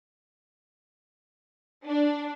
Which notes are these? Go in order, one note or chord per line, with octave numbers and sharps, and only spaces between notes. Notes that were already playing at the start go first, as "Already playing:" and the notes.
D4